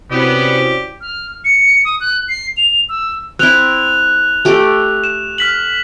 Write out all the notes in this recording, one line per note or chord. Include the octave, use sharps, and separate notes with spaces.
C3 B3 C#4 E4 F#4 G4 C5 D5
F6
C#7
D#6
F#6
C7
F7
E6
C4 E4 F#6 F7
A3 G4
E7
F6 B6 F#7